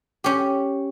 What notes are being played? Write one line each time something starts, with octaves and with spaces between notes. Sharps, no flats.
C#4 G4